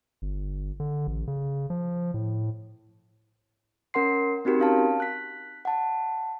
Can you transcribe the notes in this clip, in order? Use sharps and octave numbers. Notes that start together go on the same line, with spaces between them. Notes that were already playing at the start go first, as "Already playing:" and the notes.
G1
D3
A1
C#3
F3
A2
C#4 A#4 F#5 C6 C7
C4 D#4 F#4 G4 A#4
C#4 F5 A5
F#6 B6
F#5 A5